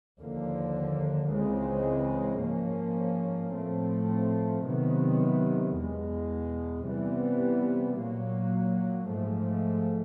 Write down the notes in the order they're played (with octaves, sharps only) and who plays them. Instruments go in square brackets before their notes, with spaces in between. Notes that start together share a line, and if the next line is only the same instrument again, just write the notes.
[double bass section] D#2 D3 F3 A#3
C#2 C#3 E3 G#3 C4
G#2 F3 A#3 C#4
A2 F3 A3 C4
C3 D#3 F#3 B3
E2 B2 G#3
C3 E3 G3 B3
A#2 F#3 A#3
G#2 F3 A3